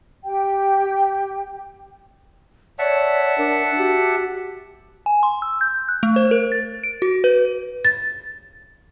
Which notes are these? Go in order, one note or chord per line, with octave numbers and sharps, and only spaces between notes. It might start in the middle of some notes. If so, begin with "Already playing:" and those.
G4 G5
C#5 D5 E5 F#5 A5
D4 A#4
F#4 G4
G#5
C6
E6
G6
F#6
A3
C5
A#4
A6
D7
F#4
B4
A6